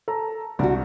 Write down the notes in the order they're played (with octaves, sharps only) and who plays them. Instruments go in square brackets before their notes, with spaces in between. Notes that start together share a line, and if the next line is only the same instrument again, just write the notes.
[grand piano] A4 A#5
[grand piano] C2 [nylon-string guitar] D4 F#4